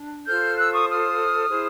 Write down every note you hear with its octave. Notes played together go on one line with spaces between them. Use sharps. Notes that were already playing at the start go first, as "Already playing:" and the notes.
Already playing: D4
F4 A4 C5 F6 G6
E6 F#6
C#6 D#6
D#6 F6
E4 G#4 C5